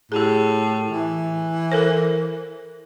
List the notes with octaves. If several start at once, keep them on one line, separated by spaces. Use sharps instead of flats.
A2 G4 G#4
E3
A4 A#4 C5